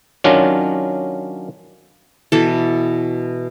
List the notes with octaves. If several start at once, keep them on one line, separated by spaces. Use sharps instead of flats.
D#3 F#3 C#4 D4 F4
B2 E3 A4